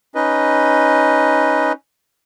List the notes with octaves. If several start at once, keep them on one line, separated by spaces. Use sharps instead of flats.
C#4 D#4 B4 D#5